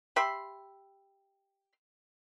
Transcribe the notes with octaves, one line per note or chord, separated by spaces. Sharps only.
G4 E5 B5 C6